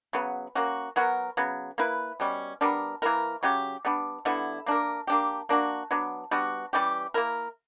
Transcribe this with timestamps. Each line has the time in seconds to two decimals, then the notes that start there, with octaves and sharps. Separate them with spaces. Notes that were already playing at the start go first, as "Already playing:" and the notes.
0.13 C#3 F#3 B3
0.55 A#3 C#4 F#4
0.96 F#3 B3 F#4 A#4
1.37 C#3 F#3 B3
1.78 A#3 E4 B4
2.20 B2 G3 C#4
2.61 G3 B3 D4 A#4
3.02 E3 A#3 E4 A#4
3.43 C#3 F#3 C#4 G4
3.85 G3 B3 D4
4.25 D3 G3 B3 E4
4.66 A#3 D4 A#4
5.07 A#3 D4 G4
5.49 A#3 D4 F#4
5.91 F#3 B3 D4
6.31 G3 B3 D4 F#4
6.73 E3 G3 C#4 G4
7.14 A#3 E4 A#4